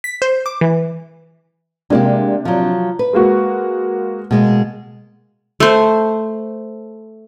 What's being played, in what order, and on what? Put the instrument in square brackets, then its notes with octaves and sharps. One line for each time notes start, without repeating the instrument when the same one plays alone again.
[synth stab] B6
C5
D6
E3
[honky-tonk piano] C3 D4 [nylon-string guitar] G#3 A#3 G4
[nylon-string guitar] F3 F#3
B4
[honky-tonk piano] G#3 A#3 F#4
[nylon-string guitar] B2 G#3 A#3
[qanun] A3 C5